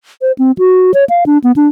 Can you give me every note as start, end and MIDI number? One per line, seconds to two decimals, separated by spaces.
0.22 0.32 72
0.38 0.51 60
0.58 0.92 66
0.94 1.04 73
1.10 1.24 77
1.26 1.38 62
1.44 1.52 59
1.56 1.68 62